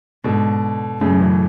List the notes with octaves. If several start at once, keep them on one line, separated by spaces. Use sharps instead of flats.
G#2 B2 D3
F#2 A2 C#3
C#3 E3